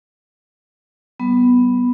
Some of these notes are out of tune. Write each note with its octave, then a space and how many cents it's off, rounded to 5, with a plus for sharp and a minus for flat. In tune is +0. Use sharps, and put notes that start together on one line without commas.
G3 -40 B3 +0